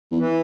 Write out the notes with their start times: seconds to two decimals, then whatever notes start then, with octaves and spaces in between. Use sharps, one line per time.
0.11 E2
0.19 E3